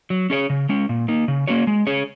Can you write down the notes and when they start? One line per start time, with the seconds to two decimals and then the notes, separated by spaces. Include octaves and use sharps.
0.10 F#3
0.30 C#4 G#4 C#5
0.50 C#3
0.69 G#3 C#4
0.89 A#2
1.08 A#3 D#4
1.28 C#3
1.47 A#3 C#4 F#4 C#5
1.67 G#3
1.87 C#4 G#4 C#5